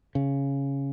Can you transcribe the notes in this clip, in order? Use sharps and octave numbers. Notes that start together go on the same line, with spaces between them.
C#3